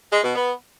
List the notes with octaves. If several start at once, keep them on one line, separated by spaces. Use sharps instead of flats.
G#3
B2
B3